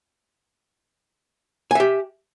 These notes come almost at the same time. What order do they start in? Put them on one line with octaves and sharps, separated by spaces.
G#5 E5 G4